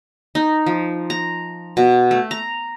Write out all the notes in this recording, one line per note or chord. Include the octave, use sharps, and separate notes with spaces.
D#4
F3
A#5
B2
A3
A#5